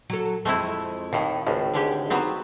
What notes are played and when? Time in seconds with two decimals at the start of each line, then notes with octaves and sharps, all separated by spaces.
0.10 F#3 A4
0.45 F2 G#3 A3 C4 E4
1.13 D#2 A2 D#3
1.47 G#1 C#2 A2
1.74 D3 G#3 G4
2.10 F#3 B3 C4